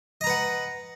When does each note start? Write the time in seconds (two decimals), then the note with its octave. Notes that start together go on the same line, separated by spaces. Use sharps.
0.21 D#5
0.24 A#5
0.27 B4
0.30 F#5